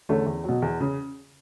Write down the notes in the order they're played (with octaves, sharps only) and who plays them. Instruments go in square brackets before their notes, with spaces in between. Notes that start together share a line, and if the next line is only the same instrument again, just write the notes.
[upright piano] E2 D3 A3 C#4
E2
B2 F#3
E2
C#3